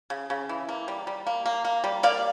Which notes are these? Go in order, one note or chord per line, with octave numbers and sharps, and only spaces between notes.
C#3
C#3
E3
A#3
G3
G3
A#3
A#3
A#3
G3
A#3 D5 F5